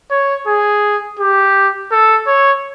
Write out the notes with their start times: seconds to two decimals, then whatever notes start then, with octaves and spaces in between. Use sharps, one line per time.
0.11 C#5
0.47 G#4
1.20 G4
1.92 A4
2.27 C#5